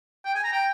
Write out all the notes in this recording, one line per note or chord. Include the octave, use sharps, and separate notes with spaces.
G5
G#5
A#5
G5